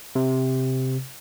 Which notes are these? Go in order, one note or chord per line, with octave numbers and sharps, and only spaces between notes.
C3